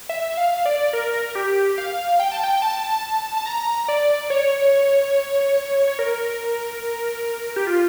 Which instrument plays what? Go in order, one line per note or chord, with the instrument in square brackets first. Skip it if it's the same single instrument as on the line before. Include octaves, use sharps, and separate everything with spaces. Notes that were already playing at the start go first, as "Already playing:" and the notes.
[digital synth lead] E5
F5
D5
A#4
G4
F5
G5
A5
G5
A5
A5
A#5
D5
C#5
C#5
A#4
G4
F4